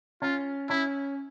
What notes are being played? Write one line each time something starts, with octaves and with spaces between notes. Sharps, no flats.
C#4 F4
C#4 E4